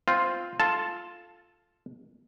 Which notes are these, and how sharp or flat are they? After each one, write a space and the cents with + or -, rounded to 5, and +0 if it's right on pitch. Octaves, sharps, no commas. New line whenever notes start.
C4 +0 F4 +0
F4 +0 A4 +0 A5 +0